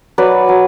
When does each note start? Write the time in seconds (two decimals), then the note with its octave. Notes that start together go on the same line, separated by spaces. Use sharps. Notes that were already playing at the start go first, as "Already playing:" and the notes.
0.18 F#3 B4 D5
0.49 F#3